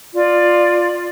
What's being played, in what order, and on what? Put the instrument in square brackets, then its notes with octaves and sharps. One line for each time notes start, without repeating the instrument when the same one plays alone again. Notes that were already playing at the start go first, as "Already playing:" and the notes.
[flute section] F4 D5